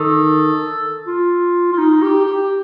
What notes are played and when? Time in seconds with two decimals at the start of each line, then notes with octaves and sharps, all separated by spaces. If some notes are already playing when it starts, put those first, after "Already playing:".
Already playing: D#3 A4
1.07 F4
1.72 F4
1.78 D#4
2.02 G4
2.26 G4